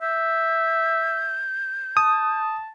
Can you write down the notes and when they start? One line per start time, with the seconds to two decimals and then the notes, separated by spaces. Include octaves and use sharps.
0.02 E5 G6
1.97 A5 D#6